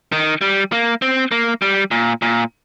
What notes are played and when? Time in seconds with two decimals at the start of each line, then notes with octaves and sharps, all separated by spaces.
0.12 D#3
0.41 G3
0.72 A#3
1.02 C4
1.32 A#3
1.62 G3
1.91 A#2
2.22 A#2